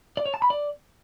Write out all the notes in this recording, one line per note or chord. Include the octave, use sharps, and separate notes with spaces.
D5
C#5
A5
B5
D5